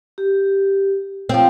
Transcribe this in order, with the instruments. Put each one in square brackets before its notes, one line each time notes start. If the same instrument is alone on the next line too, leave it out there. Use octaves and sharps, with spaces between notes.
[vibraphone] G4
[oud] F3 C4 [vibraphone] C#5 F5